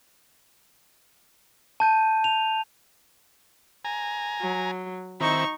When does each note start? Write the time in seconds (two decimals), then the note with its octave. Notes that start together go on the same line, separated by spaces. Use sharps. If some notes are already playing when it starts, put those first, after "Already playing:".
1.80 A5 G6 D#7
2.24 F7
3.85 G#5 A#5
4.41 F#3
5.21 D#3 C4 D#4 E4 C#6